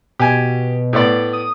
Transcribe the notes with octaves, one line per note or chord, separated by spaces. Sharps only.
B2 G4 G#5
A2 B3 D5
D#6